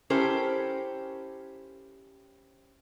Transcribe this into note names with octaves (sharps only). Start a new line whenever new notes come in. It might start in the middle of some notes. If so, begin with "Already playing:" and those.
C#4 E4 G4 A4 A#4 C5